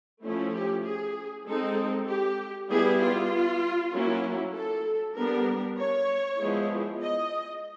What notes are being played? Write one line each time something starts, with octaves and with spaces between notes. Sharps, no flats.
F3 A3 C#4 E4
G4
G#4
G#3 C4 D#4 A4
G4
G3 B3 E4 G#4
F4
F#3 A#3 C#4 E4
A4
G3 B3 D4 A#4
C#5
F3 G#3 B3 E4
D#5